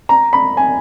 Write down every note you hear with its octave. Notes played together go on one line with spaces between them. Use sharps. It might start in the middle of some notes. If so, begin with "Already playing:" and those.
A#5
B5
G#5